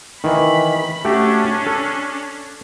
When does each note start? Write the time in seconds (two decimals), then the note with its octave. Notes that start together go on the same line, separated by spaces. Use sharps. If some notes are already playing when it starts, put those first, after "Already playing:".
0.24 D#3 E3 B5
1.05 A3 C#4 D4 F#4 G4
1.66 A4